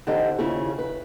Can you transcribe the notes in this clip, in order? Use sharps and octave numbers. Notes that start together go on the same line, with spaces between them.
D3 E3 C4 D#4 G4 D#5
D#2 C#3 E4 F4 G#4
B4